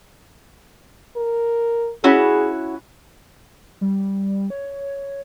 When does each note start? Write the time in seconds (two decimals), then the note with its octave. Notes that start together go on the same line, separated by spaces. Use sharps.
1.16 A#4
2.04 C#4 E4 F#4 G#4
3.81 G3
4.50 C#5